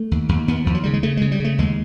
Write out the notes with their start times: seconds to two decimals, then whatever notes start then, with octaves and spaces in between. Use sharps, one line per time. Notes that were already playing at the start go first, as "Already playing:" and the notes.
Already playing: A3
0.11 D#2
0.29 D#2
0.48 D#2 B3
0.65 D#2 F3
0.74 F#3
0.83 C#3 G3
0.93 G#3
1.03 C#3 A3
1.17 C#3 G#3
1.32 G3
1.40 C#3 A3
1.58 D#2 G#3